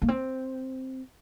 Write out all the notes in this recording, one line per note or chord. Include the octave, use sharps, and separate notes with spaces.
A#3
C4